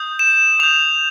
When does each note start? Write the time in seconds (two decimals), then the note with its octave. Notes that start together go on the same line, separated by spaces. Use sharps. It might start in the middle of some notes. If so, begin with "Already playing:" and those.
Already playing: D#6 G6
0.19 E7
0.60 D#6 G6 F7